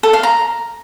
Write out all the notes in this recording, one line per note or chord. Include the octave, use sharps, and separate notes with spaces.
A4
F5
A#5